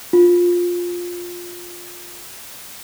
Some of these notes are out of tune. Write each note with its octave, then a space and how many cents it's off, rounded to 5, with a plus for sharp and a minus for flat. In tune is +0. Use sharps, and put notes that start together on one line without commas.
F4 +10